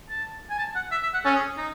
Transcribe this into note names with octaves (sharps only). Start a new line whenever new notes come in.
A5
G#5
A5
F#5
E5
E5
F#5
C#4 A4
G#4
D#4